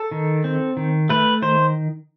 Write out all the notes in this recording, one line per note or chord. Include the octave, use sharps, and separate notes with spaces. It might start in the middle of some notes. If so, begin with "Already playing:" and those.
Already playing: A4
D#3
C4
D#3
A3 B4
D#3 C5